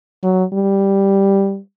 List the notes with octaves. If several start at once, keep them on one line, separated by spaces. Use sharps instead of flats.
F#3
G3